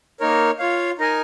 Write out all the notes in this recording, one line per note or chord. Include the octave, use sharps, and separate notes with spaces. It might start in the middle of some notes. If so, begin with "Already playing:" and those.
A#3 D#4 A#4 C#5
F4 C#5 F5
D#4 A#4 D#5 G#5